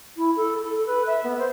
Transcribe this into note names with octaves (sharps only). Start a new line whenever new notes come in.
E4
A4
A4
B4
E5
B3
C5